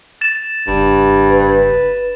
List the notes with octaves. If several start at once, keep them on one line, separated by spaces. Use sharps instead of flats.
A6 E7
F#1 G2
B4